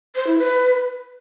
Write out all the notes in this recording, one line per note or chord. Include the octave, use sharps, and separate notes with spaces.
C5
E4
B4